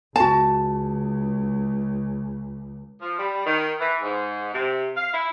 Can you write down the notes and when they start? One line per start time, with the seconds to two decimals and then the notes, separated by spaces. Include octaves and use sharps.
0.16 C#2 F#4 A5
3.01 F3
3.18 G3
3.46 D#3
3.80 E3
4.02 G#2
4.53 C3
4.96 F5
5.14 E4